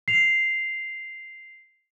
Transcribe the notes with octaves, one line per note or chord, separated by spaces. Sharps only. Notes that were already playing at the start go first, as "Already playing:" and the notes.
C7 F7